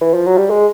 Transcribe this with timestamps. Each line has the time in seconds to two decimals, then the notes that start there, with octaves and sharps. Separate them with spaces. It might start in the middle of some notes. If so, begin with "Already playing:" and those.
0.01 E3
0.14 F3
0.26 F#3
0.38 G3
0.50 G#3